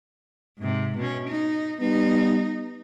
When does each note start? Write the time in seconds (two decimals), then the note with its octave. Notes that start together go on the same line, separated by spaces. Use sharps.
0.58 G#2 C3
0.98 B2 C#4
1.28 D#4
1.81 G3 B3 D#4